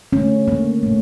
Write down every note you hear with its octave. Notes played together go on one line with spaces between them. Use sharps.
D3 A3 C#4
A#3
A#2 A3